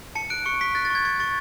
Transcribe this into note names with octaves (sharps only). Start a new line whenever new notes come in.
A5 C#7
F#6 D7
C#6 C#7
C#6 B6
F#6 A6
A6
C#6 G#6
C#6 G#6
C#6 A6